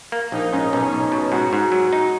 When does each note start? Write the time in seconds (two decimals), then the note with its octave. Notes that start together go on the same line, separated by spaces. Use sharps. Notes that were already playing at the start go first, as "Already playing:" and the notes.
0.12 A#3
0.32 A#1 D#4
0.52 G#2 C#4
0.72 B1 C#4
0.93 B1
1.12 B2
1.32 G#2 F#4
1.53 G#2
1.72 F#3
1.93 D#4